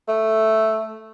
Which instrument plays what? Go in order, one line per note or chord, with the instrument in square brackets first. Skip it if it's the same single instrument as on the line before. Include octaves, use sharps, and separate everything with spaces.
[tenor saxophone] A3